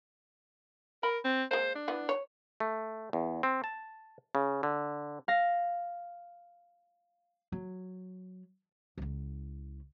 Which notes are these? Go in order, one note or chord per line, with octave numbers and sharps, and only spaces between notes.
A#4 B5
C4
G#3 A#3 C5
D4
E3 B3
C#5
A3
E2
C4
A5
C#3
D3
F5 A#6
F#3
C#2 E4